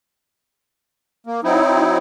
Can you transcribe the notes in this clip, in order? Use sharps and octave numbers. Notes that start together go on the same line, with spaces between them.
A#3
F#3 C4 D#4 E4